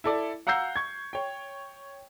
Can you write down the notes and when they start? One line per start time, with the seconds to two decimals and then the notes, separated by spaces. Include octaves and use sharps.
0.04 E4 A4 D5
0.47 F5 F#5 A#5 E6 G6 C7
0.76 C#6 G#6
1.13 C#5 G5